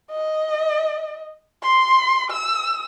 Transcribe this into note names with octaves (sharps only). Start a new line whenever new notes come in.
D#5
C6
E6